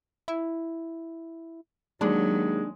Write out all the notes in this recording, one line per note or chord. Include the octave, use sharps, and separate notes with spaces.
E4
D#2 F#3 G#3 D4